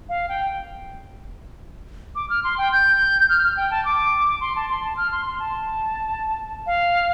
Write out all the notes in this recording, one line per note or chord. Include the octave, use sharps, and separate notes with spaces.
F5
G5
D6
F6
C6
G5
G6
F6
F6
G5
A5
D6
C6
A5
C6
A5
F6
C6
C6
A5
F5